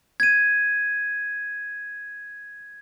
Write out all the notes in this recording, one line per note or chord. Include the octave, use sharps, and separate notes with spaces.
G#6 D#7